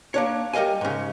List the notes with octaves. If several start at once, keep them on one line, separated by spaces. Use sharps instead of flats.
A#3 D4 C#5
G3 A#4 D#5 F5 G#5
G#2 C#3